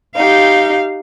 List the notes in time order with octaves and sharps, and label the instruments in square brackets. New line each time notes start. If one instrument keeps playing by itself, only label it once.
[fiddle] D#4 G4 [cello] F5